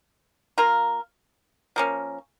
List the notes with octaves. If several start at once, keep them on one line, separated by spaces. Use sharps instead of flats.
A#3 F4 A#4
F3 A#3 C#4